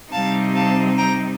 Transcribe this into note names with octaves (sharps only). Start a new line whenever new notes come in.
C3 G3 C4 D#4 F5 A5
F5 A5
G5 A#5